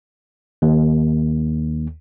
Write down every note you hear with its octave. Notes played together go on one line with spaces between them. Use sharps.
D#2